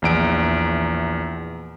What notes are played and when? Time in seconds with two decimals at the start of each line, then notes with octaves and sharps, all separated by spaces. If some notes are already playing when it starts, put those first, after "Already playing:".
0.02 A#1 E2 D7